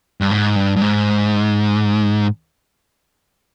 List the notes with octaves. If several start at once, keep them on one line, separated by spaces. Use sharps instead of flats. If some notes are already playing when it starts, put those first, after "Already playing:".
G2
G#2
G2
G2
G#2